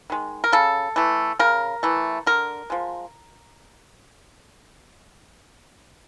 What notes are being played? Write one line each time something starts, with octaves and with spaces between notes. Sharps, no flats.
D#3 G#3
A#4
C#3 A4
E3 A3
C#3 A#4
E3 A3
D3 A#4
F3 G#3